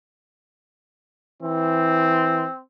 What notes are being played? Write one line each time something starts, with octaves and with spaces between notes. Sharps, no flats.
E3 C4